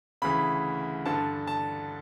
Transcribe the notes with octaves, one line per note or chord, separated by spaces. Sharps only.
D2 C#3 E3 B5
G2 D3 A5
A5